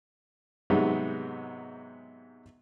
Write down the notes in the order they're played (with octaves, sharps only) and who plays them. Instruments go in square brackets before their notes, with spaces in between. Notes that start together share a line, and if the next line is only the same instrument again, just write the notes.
[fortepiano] G#2 C3 F#3 G#3 B3 D#4